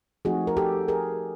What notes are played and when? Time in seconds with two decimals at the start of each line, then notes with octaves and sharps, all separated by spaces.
0.25 F3 A3 C4 D#4 F#4 G#4
0.47 A#4
0.57 G4 A4
0.88 G#4 A#4